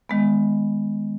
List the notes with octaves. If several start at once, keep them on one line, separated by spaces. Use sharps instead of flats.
D#3 G#3 B3